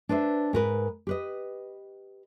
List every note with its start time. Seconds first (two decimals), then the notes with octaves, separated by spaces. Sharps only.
0.09 D4 B4 C5 D#5 E5
0.53 G#2 A#4 B4
1.07 G4 B4 D#5